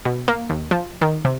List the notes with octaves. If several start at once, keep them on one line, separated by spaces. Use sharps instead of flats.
B2
A#3
D#2
F3
D#3
C3